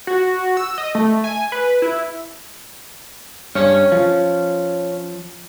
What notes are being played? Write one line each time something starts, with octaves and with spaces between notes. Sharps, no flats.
F#4
E6
D#5
A3
G#5
B4
E4
G2 C#4 C#5
F3